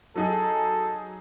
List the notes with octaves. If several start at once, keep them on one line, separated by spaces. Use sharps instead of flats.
F#3 D#4 G#4 A4